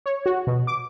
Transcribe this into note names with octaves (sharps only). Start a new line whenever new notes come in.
C#5
F#4
B2
D6